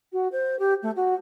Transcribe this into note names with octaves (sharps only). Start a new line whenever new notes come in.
F#4
C5
G4
A3
F#4